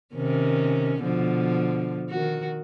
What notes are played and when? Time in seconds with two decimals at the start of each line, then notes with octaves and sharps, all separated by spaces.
0.15 C3 D#3 C#4
1.00 B2 D3 F3
2.10 D#3 F#4